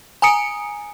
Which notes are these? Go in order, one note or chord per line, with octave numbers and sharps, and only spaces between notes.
G#5 A#5 D#6 C#7 D7